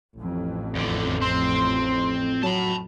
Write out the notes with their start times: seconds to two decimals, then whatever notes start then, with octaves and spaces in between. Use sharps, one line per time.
0.17 A1 F2
0.75 E2 D3
1.21 C4 C6
2.43 F#3 A5 B5